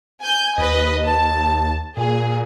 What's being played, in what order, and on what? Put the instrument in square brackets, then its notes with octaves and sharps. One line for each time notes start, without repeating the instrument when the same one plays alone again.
[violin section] G#5 G6
[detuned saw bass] D#2 [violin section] B4 D#5
[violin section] A5
[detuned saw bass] A#2 [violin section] G#4